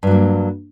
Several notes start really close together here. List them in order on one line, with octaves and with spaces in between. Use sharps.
G2 F#3 A#3